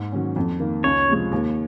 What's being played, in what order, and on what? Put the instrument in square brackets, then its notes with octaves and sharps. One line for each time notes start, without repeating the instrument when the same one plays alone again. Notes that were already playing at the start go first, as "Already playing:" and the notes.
Already playing: [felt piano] G#2
D#3 F#3 C#4
F2
D#3 A#3
[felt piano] C#2 [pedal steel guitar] C#5
[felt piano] C3 F3 G#3
D#2